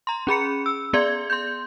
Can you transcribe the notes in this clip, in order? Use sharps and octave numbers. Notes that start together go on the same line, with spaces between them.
A#5 C6
C#4 G#4 B5 C#7
E6
B3 G#4 D5 C6 G#6
C6 G6